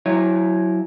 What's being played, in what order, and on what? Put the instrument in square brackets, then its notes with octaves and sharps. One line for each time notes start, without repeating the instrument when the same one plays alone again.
[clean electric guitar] F#3 E4 C#5